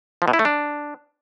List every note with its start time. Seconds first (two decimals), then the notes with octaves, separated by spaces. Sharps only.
0.22 F3
0.28 B2
0.33 E4
0.39 A3
0.45 D4